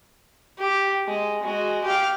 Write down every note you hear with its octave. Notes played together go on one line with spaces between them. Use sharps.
G4
G#3
G#3 F#4
G4 F5